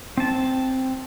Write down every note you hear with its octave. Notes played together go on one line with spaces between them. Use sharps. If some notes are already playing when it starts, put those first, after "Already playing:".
C4 A5